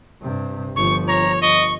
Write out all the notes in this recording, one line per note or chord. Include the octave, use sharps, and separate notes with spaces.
G2 C3
G1 F3 C#6
C#5 A#5
D#5 C#6